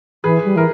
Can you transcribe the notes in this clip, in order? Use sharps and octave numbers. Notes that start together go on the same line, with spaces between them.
E3 G#4 B4
G3
E3 A#4